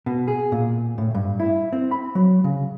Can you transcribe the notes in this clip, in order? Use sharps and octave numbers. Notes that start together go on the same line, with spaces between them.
B2
G#4
A#2
A2
G2
E4
C4
B5
F#3
C#3